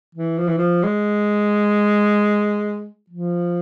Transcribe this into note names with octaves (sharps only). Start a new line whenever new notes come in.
E3
F3
E3
F3
G#3
F3